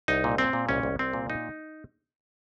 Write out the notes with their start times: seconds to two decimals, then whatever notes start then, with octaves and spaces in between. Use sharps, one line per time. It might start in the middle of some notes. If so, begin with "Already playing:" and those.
0.08 C2 D#4
0.24 A#2
0.38 A#2 C4
0.53 A#2
0.69 C2 C#4
0.83 C2
0.99 C2 C4
1.13 A#2
1.30 D#4